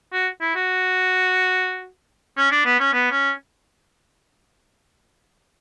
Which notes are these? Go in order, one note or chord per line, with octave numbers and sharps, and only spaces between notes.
F#4
E4
F#4
C#4
D4
B3
C#4
B3
C#4